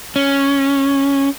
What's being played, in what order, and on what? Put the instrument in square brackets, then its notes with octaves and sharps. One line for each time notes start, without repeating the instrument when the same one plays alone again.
[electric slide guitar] C#4